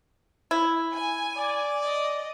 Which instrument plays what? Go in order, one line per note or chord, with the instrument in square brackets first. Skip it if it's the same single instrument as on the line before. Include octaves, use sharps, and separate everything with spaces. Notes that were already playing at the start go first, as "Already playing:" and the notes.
[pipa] E4
[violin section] G#5
[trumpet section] D5
[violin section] D#5